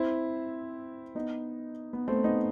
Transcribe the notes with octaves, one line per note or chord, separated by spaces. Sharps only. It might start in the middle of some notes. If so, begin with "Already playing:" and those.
Already playing: C4 E4
B3 D#4
B3
A3 C4
B3 D#4